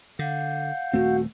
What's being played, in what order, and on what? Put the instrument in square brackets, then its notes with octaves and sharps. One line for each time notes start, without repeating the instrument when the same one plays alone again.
[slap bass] D3 [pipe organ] F5 F#5 G6
[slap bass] D#1 A3 C4 [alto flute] F#4